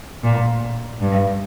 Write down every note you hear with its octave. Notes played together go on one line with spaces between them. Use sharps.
A#2
G2